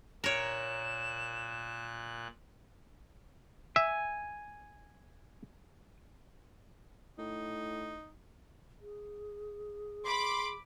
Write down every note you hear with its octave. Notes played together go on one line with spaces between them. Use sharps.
A#2 A#4 C#5 F#6 E7
E5 G#5
A2 D#4
G#4
B5 C6 D6